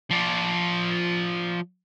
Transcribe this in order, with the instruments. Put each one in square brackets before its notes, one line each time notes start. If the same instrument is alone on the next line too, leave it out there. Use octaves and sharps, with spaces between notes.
[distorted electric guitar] F3 D5